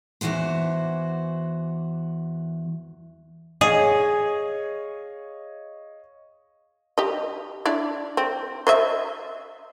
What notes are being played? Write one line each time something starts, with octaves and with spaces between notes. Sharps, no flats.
E2 C#3 E3 F#4 C5
G#4 C#5 D#5 F5
G4 D#5
D4 E4 D5
C4
C5 D#5 E5